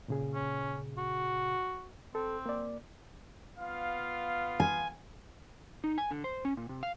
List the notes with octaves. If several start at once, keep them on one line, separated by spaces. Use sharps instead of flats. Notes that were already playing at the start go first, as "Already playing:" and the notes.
A#2 C#3 G#4
C#4
F#4
C4 A4
A#3 D5
B3 F4 F5
G#5
D#4
G#5
D3
C5
C#4
A#2
C3
F5